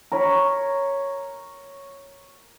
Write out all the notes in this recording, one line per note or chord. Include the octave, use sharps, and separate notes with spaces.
A#4 C#5 B5